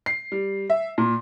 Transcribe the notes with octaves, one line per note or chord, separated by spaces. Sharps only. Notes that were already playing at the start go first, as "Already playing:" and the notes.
C7
G3
E5
A#2